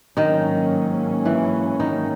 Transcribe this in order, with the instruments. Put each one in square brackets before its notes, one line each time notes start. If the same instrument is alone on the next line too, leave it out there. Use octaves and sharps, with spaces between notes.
[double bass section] G#2 F#3 A#3 C#4 [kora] D#3 D#4
[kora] E3 E4
D#3 D#4